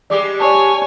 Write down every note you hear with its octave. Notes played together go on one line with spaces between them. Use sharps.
G3 G#3 G4 D5 D6
C#5 D5 G#5 A5